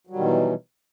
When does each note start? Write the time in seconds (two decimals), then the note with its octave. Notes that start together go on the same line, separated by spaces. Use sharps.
0.07 F#3
0.10 G3
0.13 D#3
0.16 B2
0.19 E3